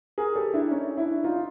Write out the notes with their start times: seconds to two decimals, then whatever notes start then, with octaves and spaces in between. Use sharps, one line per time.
0.18 G#4 A#4
0.36 G4 A4
0.54 D4 E4
0.71 C#4 D#4
0.97 D4 E4
1.24 D#4 F4